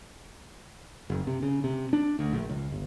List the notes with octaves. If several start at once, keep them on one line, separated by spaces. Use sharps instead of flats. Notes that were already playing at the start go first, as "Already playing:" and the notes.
F#1
C3
C#3
C3
D4
D2
A#1
C#2
G1